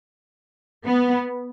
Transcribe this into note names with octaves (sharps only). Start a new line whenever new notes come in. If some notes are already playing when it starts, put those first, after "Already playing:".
B3